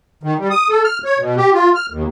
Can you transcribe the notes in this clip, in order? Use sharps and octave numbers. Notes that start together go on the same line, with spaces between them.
D#3
G3
D#6
A4
F6
C#5
B2
G4
F4
F6
D#2